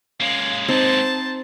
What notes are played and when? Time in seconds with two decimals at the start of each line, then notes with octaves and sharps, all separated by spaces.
0.20 G#3 A#3 C#4 F5
0.68 C4 D#4 C5 A5